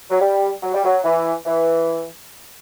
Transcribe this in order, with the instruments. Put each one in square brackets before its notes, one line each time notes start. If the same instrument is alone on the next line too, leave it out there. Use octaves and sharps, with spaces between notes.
[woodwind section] F#3
G3
F#3
G3
F#3
E3
E3